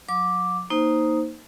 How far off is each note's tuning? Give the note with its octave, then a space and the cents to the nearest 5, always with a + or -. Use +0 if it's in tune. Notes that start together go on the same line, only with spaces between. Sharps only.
F#3 -35 D6 +0
A#3 +0 D#4 +5 C5 +0